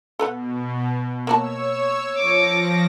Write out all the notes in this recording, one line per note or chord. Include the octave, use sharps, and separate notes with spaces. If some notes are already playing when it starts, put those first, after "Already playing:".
B2 A4 B4 F#5
A#3 F#4 C#5 A5 E6
F3 D6 A#6 C#7